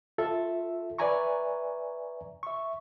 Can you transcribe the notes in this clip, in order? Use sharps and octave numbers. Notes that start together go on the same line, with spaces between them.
F4 A4 E5
B4 D5 E5 G#5 A#5 C#6
E5 C#6